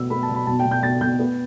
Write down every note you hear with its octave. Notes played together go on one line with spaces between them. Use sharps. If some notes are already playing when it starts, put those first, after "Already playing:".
Already playing: B2 B3 E6
B3 B5
A5
B2
B5
B2 A5
G5
B2
G6
B2 A6
B2 G6
B3